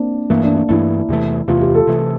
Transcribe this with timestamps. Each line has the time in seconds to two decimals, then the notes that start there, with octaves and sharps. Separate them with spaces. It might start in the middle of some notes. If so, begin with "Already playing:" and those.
Already playing: A#3 C4 D4
0.30 G2 E3 A3 A#3
0.43 D4
0.56 D4
0.69 G2 E3 A3 E4
1.09 E2 C3 E3 A3
1.48 E2 C3 E3 A3 F4
1.62 G4
1.75 A4
1.87 C3 E3 A3